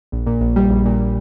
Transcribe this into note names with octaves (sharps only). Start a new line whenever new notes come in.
A#1
A#2
A#1
G3
A#1
A#2